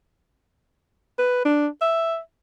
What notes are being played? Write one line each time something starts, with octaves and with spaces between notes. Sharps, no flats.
B4
D4
E5